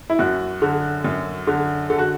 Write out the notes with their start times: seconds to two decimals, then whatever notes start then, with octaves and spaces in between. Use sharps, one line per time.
0.10 E4
0.19 F#2 F#4
0.62 D3
1.04 F#2
1.47 D3
1.90 D3 A4
1.99 F#4